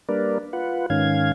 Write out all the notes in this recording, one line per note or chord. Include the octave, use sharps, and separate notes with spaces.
G3 A#3 D4 A#4 B4 D5
F4 B4 F#5
G#2 D#3 C#4 F5 G#6